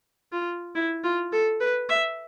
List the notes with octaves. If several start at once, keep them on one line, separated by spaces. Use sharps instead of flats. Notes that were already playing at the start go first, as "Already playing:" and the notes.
F4
E4
F4
A4
B4
E5